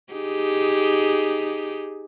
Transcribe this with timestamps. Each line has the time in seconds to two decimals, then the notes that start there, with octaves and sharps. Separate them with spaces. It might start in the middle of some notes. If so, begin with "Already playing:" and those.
0.13 D#4 G4 G#4